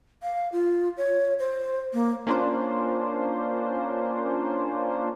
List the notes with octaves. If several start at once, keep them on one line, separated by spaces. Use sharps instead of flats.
F5
F4
C#5
C5
A#3
A#3 C#4 D4 F4 C5